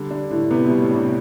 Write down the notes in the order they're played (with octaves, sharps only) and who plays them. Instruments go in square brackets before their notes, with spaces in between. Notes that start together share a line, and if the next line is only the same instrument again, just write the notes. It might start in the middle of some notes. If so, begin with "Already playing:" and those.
Already playing: [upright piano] D3 [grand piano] G3
[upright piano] D3 [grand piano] D4
[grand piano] A2 [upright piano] D3
[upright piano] C3 [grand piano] B3
[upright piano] B2 [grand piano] G3
[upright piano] A2
[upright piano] C3 [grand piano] D4